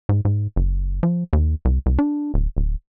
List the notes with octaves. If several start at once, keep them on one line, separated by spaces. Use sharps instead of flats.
G#2
G#2
F#1
F3
D#2
C2
C2
D4
D1
D1